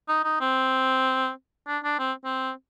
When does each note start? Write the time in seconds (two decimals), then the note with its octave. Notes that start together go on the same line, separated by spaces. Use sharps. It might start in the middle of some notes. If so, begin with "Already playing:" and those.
0.09 D#4
0.24 D#4
0.41 C4
1.68 D4
1.84 D4
1.99 C4
2.25 C4